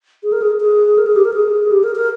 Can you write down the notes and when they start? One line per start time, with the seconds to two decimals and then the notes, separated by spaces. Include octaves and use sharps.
0.23 G#4
0.32 A#4
0.42 G#4
0.60 G#4
0.98 A#4
1.06 G#4
1.16 G4
1.25 A#4
1.34 G#4
1.71 G4
1.83 A#4
1.95 A#4